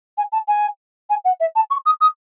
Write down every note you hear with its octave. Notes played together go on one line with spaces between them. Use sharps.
G#5
A5
G#5
G#5
F#5
E5
A5
C#6
D#6
D#6